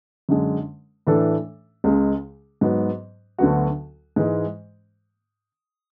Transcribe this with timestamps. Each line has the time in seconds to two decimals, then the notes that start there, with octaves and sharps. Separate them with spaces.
0.29 F#2 D3 G#3
1.07 A2 E3 A3 D4 A4
1.84 C#2 C#3 G#3
2.61 G#2 F#3 B3
3.39 D2 D3 F#3 B3 F#4
4.16 G#2 E3 G#3